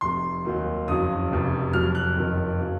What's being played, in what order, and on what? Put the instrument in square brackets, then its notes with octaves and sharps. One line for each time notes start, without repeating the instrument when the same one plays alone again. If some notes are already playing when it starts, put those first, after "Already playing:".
[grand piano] F1 F2 C3 C6
D#2 D#3 F#3
F#1 F2 C#3 F#3 D#6
F1 F2 C3
F2 C3 F#3 F6
F#6
F#1 F2 D#3 F#3
C#3 F#3